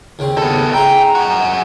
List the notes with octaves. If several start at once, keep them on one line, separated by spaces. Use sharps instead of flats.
D#2 C#3 C4
B3 A4
G#3 E4 G5 A#5
F#2 F#4